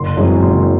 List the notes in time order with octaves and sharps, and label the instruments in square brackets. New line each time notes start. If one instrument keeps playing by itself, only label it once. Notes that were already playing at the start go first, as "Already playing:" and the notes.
Already playing: [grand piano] F#1 C6
F#2 E3 G#3 C4
F#1 C6